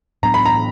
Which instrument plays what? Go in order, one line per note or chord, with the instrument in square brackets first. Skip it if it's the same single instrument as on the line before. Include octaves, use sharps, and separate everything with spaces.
[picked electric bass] A2 F#3 B3 D4 [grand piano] A#5
[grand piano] B5
A#5